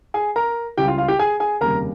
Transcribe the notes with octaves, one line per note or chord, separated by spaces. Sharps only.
G#4 G#5
A#4 A#5
C#2 C#3 G3 G4 G5
F4 F5
F4 F5
G4 G5
G#4 G#5
G#4 G#5
F1 D#2 C#3 G3 A#4 A#5